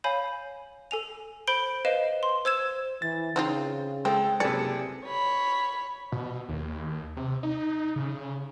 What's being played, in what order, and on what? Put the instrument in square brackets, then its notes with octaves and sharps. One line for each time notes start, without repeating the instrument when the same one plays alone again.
[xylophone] C#5 F5 G#5 B5 G6
A4 G#5 F7
C5 B5 G6 D7 G7
B4 C5 D#5 F5 D#7 E7
C6
C5 E6 G#6 E7
[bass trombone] E3 [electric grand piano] A6
[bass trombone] C#3 [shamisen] C4 D#4 F4
[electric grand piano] G#3 A4 [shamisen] C4 [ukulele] G5
[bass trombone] F#1 [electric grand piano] C3 C#7 [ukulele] G#4 A4 B4 [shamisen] D5
[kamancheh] C#5 B5
[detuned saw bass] B2
D#2
C3
D#4
C#3